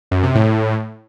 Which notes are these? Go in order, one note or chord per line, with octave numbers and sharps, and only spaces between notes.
F#2
C3
A2